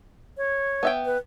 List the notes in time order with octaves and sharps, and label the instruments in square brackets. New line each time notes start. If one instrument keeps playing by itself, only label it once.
[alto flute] C#5
[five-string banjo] B3 E5 G5
[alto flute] B4